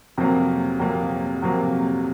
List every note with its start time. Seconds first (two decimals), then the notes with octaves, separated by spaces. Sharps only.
0.18 F2 C3 F#3 A#3
0.79 F2 C3 F#3 A#3
1.42 F2 C3 F#3 A#3